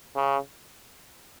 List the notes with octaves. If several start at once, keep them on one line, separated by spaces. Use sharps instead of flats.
C#3